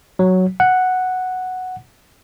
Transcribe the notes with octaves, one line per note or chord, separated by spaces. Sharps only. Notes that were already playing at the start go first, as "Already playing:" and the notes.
F#3
F#5